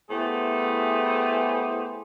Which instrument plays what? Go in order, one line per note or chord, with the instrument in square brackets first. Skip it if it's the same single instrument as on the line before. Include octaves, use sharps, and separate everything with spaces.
[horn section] A3 B3 E4 G4 G#4 C5